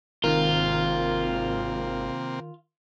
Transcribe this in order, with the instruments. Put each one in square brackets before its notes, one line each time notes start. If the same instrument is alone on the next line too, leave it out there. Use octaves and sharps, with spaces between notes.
[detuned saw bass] G#1 [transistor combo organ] C3 A#3 C4 [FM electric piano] D#3 A#4 [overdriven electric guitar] F4